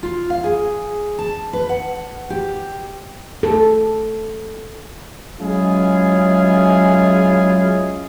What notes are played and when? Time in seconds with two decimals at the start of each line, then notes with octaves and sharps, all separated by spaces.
0.03 F4
0.30 F5
0.44 G#4
1.19 A5
1.53 B4
1.69 F#5
2.30 G4
3.43 A4
5.40 F#3 G#3 C#4 E4 F4 G#4